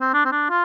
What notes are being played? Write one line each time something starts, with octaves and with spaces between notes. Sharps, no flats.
C4
D4
C4
D4
F4